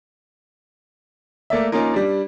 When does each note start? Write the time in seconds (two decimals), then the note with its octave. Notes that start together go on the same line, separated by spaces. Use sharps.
1.50 A3 A#3 D5 E5
1.72 A#3 C#4 D#4 F4 A#4
1.93 G3 D4